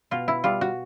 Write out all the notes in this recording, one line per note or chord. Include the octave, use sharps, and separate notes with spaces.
B2 F4
E4
G3 F4
F#4